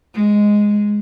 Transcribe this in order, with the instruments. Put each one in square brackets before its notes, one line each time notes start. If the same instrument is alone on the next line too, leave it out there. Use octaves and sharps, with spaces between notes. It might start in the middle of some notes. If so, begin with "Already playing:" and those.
[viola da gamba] G#3